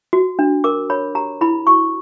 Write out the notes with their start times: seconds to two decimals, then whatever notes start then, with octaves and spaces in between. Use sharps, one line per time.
0.13 F#4
0.39 D4
0.64 A#4 D6
0.90 C#5 B5
1.15 G4 A#5
1.41 E4 B5
1.67 F#4 C#6